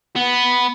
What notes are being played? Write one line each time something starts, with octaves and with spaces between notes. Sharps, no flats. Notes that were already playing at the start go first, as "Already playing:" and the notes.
B3